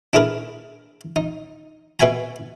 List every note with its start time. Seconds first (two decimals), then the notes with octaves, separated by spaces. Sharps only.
0.13 D4 E4 G#4 A#4 B4
1.16 D#4
2.00 B2 B4 E5 G#5 A#5